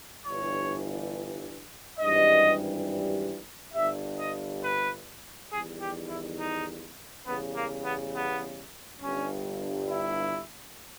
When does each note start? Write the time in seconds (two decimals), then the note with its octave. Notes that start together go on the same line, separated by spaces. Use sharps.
0.24 G1 G2 E3 C#5
1.99 G#1 G2 E3 G3 D#5
3.74 G1 G2 G3 E5
4.18 D#5
4.62 B4
5.50 E2 D#3 G3 G#4
5.80 G4
6.08 E4
6.37 D#4
7.25 E2 C#3 G3 B3
7.55 A#3
7.84 B3
8.13 B3
9.00 G1 G2 G3 C#4
9.88 E4